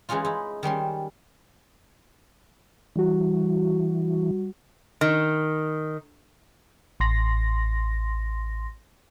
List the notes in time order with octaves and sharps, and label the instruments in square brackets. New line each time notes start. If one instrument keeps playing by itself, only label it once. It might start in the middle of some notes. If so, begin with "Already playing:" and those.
[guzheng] E3 G#3 C#4 D#4 F4
D#4 E4
D#3 G3 C#4 C6
[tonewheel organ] E3 [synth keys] G3 F#4
[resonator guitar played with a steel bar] D#3
[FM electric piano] A1 C6 A#6